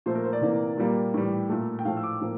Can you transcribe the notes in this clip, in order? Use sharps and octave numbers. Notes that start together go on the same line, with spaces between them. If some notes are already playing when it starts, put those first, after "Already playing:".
A#2 F3 A3 C5
A#4
C5
D5
C3 E3 A#3
A#2 G3 A#3
A2 E3 G3
A#2 A3
G5
A2 F3 A3 F5
E6
D6
A2 F3 A#3